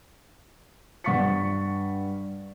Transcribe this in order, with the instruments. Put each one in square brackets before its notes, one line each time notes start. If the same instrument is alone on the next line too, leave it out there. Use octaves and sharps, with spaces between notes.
[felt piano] G2 F#5 C#6 A6 B6 C#7